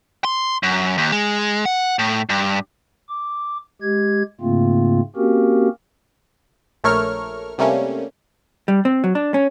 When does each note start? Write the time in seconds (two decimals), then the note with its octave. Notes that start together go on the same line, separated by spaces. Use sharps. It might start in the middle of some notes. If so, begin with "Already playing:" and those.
0.25 C6
0.63 F#2
0.98 D#2
1.12 G#3
1.65 F#5
1.99 A2
2.30 G2
3.09 D6
3.82 G#3 G4 G#6
4.41 G#2 C#3 A3 A#3 C4 F4
5.16 A#3 C4 C#4 F#4 G4 A#4
6.84 A#1 A3 A#4 C#5 C#6 F6
7.58 C3 G3 A3 A#3 C#4
8.68 G3
8.85 C4
9.04 F#3
9.15 D4
9.34 C#4